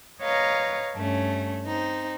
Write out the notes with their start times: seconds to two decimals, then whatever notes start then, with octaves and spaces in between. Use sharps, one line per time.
0.21 B4 C#5 D#5 F5 A#5
0.95 G2 A3 C#4
1.66 C4 D#4